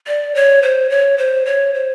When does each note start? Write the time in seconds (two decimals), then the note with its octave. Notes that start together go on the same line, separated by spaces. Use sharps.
0.07 D5
0.35 C#5
0.62 C5
0.90 C#5
1.18 C5
1.45 C#5
1.74 C5